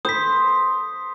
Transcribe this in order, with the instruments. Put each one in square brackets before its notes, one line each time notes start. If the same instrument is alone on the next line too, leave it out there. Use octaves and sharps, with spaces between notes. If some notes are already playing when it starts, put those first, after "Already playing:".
[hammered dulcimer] C5 [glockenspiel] D#6 B6